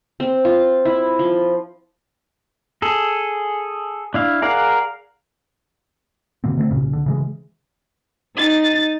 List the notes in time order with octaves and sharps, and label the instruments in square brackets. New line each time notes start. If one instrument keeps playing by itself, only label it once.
[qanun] C4
F4
E4
F3
[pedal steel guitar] G#4 A4
D4 E4 F5
G#4 A#4 D5 F5 F#5
[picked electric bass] B2 D3 A#3 C4
D3 A3 A#3 C4
C2 A#2 C#3
D3
C#3 E3 G#3
[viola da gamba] D#4 [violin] A6